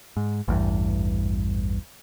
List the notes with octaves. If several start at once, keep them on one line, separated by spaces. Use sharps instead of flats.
G#2
A1 E2 G2